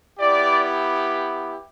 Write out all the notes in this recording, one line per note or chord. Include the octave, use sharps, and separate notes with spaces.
B3 E4 G4 D5